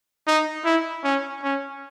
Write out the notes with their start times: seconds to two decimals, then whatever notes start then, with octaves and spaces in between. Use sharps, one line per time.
0.27 D#4
0.65 E4
1.04 C#4
1.43 C#4